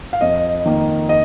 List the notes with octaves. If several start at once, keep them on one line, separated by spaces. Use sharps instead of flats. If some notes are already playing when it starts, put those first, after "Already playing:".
F5
F2 D#5
D#3 A#3
D#5